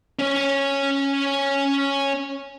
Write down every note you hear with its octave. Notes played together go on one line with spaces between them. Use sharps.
C#4 C#5